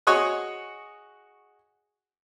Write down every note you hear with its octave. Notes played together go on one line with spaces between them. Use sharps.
F#4 G#4 C#5 D#5 F#5